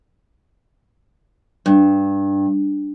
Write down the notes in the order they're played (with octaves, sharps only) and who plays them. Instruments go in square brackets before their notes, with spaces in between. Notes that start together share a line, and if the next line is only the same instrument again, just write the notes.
[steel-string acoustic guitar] G2